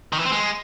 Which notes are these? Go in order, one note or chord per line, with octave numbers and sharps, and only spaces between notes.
D#3
E3
C4
G#3